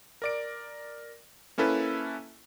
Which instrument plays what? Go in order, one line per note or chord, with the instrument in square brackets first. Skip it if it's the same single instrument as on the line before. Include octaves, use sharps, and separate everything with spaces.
[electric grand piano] A#4 D5 D7
A#3 C#4 E4 A4 B4